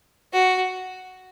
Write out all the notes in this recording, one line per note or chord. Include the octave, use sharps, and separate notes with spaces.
F#4